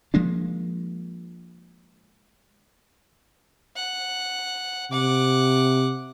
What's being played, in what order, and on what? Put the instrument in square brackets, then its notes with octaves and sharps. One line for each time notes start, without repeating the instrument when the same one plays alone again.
[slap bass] F3 G#3 A#3 D4
[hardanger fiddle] F#5
[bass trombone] C3 [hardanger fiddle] F#5 D6